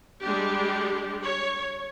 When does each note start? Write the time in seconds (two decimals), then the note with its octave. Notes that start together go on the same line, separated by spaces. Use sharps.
0.23 G3 G#3 D4 G4
1.23 C#5